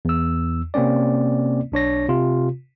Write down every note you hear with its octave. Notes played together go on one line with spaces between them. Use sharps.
E2 E6
C3 A#3 C4 C#4 D5
B1 D4 C#5 A#6
C3 F4